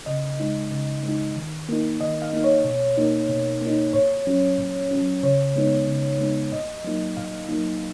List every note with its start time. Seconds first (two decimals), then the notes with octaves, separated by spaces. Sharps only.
0.06 C#3 D#5
0.40 G#3 D#4
0.71 C#3
1.03 G#3 D#4
1.36 D#3
1.69 A#3 D#4
2.01 D#3 D#5
2.22 F5
2.33 A#3 D#4
2.44 C#5
2.65 B2
2.97 A#3 D#4
3.29 B2
3.61 A#3
3.67 D#4
3.93 A#2 C#5
4.27 F#3 C#4
4.58 A#2
4.91 F#3 C#4
5.23 C#3 C#5
5.56 G#3 B3 D#4
5.88 C#3
6.19 G#3 B3 D#4
6.52 A#2 D#5
6.84 F#3 A#3 D#4
7.17 A#2 F5
7.49 F#3 A#3 D#4